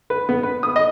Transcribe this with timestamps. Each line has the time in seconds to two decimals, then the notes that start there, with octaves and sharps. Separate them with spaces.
0.10 B4
0.29 B3
0.43 B4
0.63 D#6
0.76 D#5